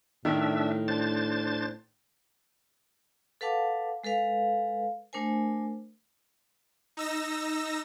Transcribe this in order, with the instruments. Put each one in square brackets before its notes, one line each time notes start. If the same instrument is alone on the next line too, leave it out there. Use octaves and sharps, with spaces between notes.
[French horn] A2 [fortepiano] D#3 [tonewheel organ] D4 E5
[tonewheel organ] D4 C5 A6
[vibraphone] A4 B4 F5 F#5 A5 D6
G#3 A4 B4 F5
A3 D4 A#4 C5 G#5
[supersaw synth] D#4 E6 A#6